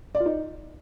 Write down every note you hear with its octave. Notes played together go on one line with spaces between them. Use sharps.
D5
F4
D#4